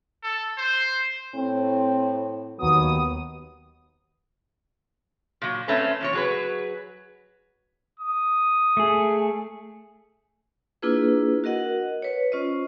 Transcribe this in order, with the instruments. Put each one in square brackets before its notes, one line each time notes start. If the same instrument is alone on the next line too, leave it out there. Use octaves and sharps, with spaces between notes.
[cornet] A4
C5
[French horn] A2 [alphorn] C4
[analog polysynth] D#2 D#6 [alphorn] F#3 [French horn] B3
[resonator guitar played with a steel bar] A#2 F#3
A3 C4 C#4 B4
E2 A#2 C#5
F#3 G#4 B4
[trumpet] D#6
[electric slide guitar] A3 G#4
[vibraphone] A#3 D4 E4 F4 G#4 B4
F#4 A#4 D#5 F#5
B4 C#5
C#4 F4 C5 D#5